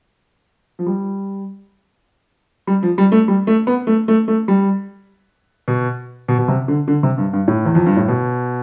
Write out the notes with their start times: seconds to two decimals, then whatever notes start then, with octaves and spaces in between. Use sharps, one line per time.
0.79 F3
0.86 G3
2.67 G3
2.83 F3
2.98 G3
3.12 A3
3.28 G3
3.47 A3
3.67 B3
3.87 A3
4.08 A3
4.28 A3
4.48 G3
5.68 B2
6.28 B2
6.39 B2
6.48 C3
6.68 D3
6.88 D3
7.03 C3
7.18 G2
7.33 G2
7.48 A2
7.65 E2
7.75 F2
7.86 G2
7.97 A2
8.08 B2